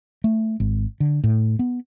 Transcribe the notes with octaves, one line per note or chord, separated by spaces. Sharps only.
A3
G#1
D3
A2
B3